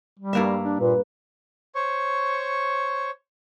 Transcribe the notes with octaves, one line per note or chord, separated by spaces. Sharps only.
G3
G2 A#3 E5
D4
A#2 B4
C5 C#5 C#6